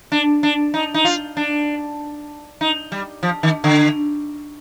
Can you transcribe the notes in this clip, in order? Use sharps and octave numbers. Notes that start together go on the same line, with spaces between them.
D4
D4
D#4
D#4
F4
D4
D#4
G3
F3
D#3
D3